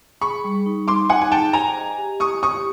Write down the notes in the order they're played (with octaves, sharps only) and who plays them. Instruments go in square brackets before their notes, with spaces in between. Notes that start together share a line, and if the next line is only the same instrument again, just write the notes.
[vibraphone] G#4 [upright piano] B5 C#6
[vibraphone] G3
D#4
[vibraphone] D#4 [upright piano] C6 D6
[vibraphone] D#4 [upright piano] F#5 G#5
[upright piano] G#5
[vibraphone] G#4 [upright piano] G5 A5
[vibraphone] C5 [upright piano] G#5 A#5
[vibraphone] D#5
G4
[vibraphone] E4 [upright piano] C#6 D#6
[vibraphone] G4 [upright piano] C#6 D#6